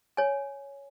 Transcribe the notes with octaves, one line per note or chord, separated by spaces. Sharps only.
C#5 G#5